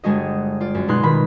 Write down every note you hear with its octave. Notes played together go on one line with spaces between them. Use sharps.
G1 G#3 D4 F#4 D#5
F4 D5
F#2
B2 G#3 D#4 C6 F#6
B2 D#3 B5